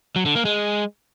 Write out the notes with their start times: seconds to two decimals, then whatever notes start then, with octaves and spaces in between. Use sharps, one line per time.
0.16 F#3
0.26 D3
0.35 A#3
0.45 G#3